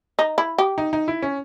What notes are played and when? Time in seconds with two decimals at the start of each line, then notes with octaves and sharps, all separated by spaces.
0.19 D#4
0.38 E4
0.58 G4
0.78 D#4
0.93 D#4
1.08 E4
1.23 C#4